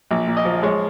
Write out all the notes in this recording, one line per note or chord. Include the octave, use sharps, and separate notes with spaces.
A#1
A#2
D#5
F3
G#3 C#5